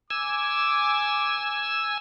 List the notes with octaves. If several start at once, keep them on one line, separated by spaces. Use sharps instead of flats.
G#5 D6 E6